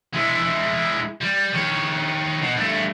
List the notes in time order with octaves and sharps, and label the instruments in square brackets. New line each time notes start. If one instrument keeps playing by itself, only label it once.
[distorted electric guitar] G#3 E4
G3
D#3 C#5
B2
G2 A3